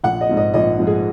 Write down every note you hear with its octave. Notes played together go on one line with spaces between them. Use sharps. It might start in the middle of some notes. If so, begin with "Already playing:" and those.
A#1 F#5
D#5
G#2 F3
D#5
A#1 D#5
G#2 F3
G#4